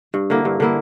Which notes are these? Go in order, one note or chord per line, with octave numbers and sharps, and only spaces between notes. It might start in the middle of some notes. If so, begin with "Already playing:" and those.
G2
D3 A#3 E4
G2
D3 A#3 E4